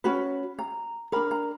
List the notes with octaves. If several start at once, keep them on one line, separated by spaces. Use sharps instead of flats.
C#4 F#4 B4 B5
A#5
D4 A#4 B5
A#5